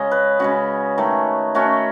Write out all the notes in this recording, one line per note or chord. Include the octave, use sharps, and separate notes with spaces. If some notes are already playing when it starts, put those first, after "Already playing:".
Already playing: C#3 G#3 C#4 D#5
B4
C#3 G#3 C#4 F#4
D#3 A3 C#4
D#3 A3 C#4 F#4